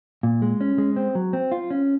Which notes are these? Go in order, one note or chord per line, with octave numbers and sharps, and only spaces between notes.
A#2
G#3
C#4
G#3
C4
F#3
C4
F4
C#4